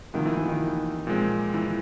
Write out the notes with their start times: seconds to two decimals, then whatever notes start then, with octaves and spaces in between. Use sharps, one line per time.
0.13 D2 C3 D#3 F3 A#3
0.26 E3
0.37 E3
0.48 D#3
1.07 A#2 F3 G#3 C4
1.54 E3